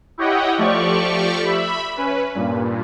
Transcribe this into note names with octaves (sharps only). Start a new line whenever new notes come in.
E4 G4 C#5 D#5 F#5 G5
F3 A3 G4 D5 C#6
E5 B5
C#4 B4
G2 A#2